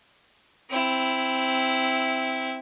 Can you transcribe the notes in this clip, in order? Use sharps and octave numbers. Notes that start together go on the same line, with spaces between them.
C4 E4